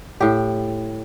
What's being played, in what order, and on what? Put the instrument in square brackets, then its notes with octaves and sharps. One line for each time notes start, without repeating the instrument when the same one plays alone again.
[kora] A2 G4